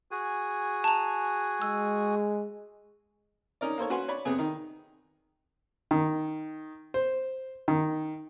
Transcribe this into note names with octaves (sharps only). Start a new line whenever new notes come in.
F#4 G#4 G#5
A5 A#5
G#3 E6
C#4 D#4 A#4 D5
A#3 A4 C5 C#5
C#4 F#4 B4 G#5 C6
C#5 D5 B5
F2 C3 B3 G#4 G#5
D#3 D#4
D#3
C5
D#3